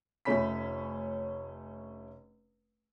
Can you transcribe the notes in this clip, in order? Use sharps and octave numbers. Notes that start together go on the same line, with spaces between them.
F1 A3 C#4 B5 B6